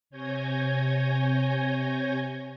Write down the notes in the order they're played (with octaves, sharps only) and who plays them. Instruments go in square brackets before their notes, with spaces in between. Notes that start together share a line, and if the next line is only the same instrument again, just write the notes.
[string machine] C3 C#5 G#5 G6 G#6 A#6